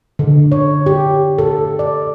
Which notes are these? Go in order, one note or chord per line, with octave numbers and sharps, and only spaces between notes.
D3
C#5
G4
A4
D5